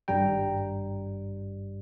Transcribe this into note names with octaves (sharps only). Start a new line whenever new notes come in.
G#1 G2 G3 G5 A#5